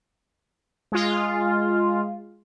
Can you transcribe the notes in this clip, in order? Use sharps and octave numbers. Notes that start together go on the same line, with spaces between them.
G#3 F4